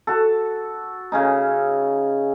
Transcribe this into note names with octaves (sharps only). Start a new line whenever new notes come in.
F#4 A4
C#3 C#4 D#4